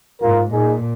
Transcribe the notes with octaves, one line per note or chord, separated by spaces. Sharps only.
G#2 F4 A#4
A#2 D#4 G#4